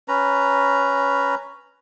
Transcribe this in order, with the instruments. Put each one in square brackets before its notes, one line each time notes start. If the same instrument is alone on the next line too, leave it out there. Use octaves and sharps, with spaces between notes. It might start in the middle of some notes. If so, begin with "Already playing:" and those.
[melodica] C#4 B4 A#5